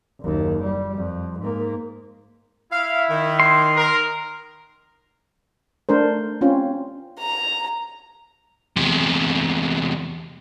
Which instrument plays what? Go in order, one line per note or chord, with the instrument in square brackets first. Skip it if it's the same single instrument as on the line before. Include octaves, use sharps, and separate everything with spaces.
[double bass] F#1 D#2
G3
F2
G#2 A#3
[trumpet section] E4 [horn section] F5
[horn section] D#3
[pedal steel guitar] C6
[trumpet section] A#4
[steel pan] A3 D4 A#4 C5
C4 C#4 F4
[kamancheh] A#5
[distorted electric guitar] E2 C3